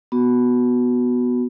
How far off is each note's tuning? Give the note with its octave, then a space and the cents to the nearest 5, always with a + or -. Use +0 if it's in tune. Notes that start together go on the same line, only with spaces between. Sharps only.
B3 +0 F#4 +0